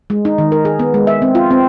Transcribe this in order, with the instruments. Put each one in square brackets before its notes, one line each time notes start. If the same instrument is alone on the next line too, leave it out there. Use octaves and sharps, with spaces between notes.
[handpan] G#3
D#4
D#3
A#4
G#4
B3
G#3
E5
C4
F4
C4